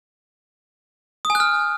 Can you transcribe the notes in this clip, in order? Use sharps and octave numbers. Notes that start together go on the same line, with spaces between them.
D#6
G#5
F#6
F6